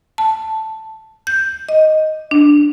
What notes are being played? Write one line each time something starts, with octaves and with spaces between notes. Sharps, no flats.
A5
G6
D#5
D4